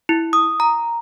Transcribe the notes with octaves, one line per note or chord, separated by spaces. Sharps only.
E4
D#6
A#5